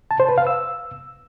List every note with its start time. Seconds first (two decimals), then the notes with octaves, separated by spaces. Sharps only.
0.11 A5
0.20 C5
0.29 B4
0.38 F5
0.47 E6